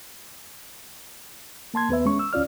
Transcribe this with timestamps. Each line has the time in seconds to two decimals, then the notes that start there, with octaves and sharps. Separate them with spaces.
1.74 A#3 A5 C6 G#6
1.89 D#2 B3 B4 E5
2.05 G#3 C#4 C#6
2.19 E6
2.33 D2 C#4 F4 D5 F6